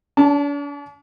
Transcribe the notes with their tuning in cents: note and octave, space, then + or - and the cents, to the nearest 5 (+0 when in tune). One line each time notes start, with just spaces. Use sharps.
D4 -45 A5 +0